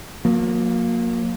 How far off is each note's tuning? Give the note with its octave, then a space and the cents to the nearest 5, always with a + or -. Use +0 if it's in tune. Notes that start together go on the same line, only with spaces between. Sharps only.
F#3 -45 A#3 +0